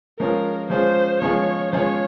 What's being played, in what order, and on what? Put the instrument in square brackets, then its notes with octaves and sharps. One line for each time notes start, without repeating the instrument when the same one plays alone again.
[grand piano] F3 G#3 C#4 F4 G#4 [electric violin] A#4
[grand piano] F3 G#3 C#4 F4 G#4 [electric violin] C5
[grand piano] F3 G#3 C#4 F4 G#4 [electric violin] C#5
[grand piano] F3 G#3 C#4 F4 G#4 [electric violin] C#5